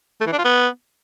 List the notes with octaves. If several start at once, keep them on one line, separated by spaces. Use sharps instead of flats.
A3
E3
D4
F4
B3